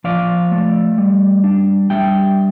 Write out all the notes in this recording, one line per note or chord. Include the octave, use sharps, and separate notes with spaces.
F3 D5 F5
A3
G3
D4
G3 E5 G5